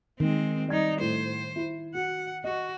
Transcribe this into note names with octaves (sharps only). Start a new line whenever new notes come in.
D#3 G#3 C4
G3 D#4 D5 G#6
A2 C5
E4
F#4 F#5
F#4 D#5